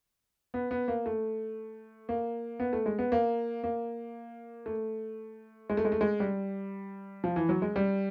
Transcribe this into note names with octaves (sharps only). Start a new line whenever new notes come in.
B3
B3
A#3
A3
A#3
B3
A3
G#3
B3
A#3
A#3
A3
G#3
A3
G#3
A3
G#3
G3
F3
E3
F#3
G#3
G3